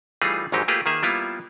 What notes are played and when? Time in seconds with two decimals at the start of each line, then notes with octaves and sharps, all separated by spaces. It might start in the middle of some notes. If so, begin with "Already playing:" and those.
0.22 E3 G3 A3 D#4 F4 G#4
0.52 G#1 G#2 E3 F#3 D#4 G4
0.68 A3 A#3 F4 G4 G#4 B4
0.86 D#3 A#3 G#4 E5
1.03 G3 A#3 B3 E4 F4